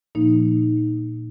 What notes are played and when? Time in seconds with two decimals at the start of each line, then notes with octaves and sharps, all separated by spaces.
0.15 A#2 F3 A#3 D#4